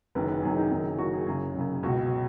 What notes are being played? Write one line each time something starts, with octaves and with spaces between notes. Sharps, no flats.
F#1 F#2 D#3 B4
B4
F#1 F#2 D#3 G#4
D#4
F#1 F#2 D#3
F#1 F#2 D#3 F#4
G#4
F#1 F#2 C#3 G#4
F#1 F#2 C#3
C#2 B2 F#4